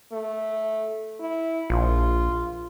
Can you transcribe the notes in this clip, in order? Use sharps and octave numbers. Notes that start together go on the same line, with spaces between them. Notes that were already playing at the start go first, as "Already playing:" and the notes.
A3
E4
A#1 F4